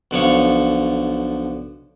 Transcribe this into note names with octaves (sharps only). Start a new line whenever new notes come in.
B1 D3 F3 C#5